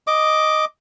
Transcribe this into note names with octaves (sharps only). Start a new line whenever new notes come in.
D#5 D6